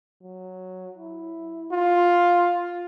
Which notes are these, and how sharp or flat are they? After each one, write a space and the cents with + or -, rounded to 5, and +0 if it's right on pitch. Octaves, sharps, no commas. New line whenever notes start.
F#3 -5
E4 +0
F4 +5